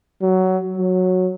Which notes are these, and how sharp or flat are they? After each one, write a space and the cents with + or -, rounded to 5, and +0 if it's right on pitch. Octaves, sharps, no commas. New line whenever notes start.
F#3 +15
F#3 -10